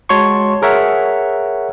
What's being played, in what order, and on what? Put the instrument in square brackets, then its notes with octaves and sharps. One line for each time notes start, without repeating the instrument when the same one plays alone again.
[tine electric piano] G#3 F#4 C#5 A5 C6 C#6
G#4 A#4 C#5 E5 F#5